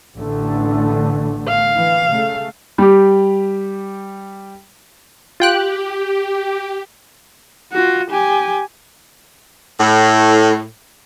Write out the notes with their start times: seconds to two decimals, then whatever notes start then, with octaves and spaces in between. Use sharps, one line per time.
0.17 A1 D3 A3
1.48 F5
1.76 E3
2.10 C#3 A3
2.78 G3 G4
5.40 F4 G4 G5 F#6
7.73 F4 F#4
8.10 G4 G#5
9.80 A2